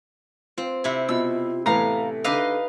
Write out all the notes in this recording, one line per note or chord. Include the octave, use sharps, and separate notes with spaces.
C4 F4
C3 E4
B2 F4 E6
A2 E3 B3 A4 F5 A#5
D3 D#4 B4 D#5 F5 D6 E6